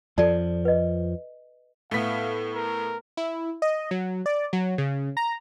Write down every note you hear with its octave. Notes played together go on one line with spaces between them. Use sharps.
F2 F3 A4 D5 A5
B4 D#5
A2 A3 B3 F5 B6
A#4
E4
D#5
F#3
D5
F#3
C#3
A#5